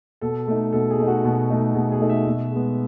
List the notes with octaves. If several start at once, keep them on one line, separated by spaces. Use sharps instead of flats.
B2 A4
A3 D#4
B2 A4
G#4
A3 D#4
F#4
B2
A3 D#4
B2 G#4
G#4
A3 D#4
E5
B2
G#3 B3